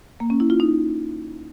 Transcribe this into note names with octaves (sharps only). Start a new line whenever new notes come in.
A#3
C#4
E4
F4
D#4